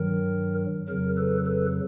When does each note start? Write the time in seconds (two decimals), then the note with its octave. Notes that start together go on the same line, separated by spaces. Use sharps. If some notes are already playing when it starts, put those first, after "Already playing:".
Already playing: G2 D#3 F#3 A#4
0.89 F2 C#3 F#3 A#4
1.17 A4 B4
1.46 A4 B4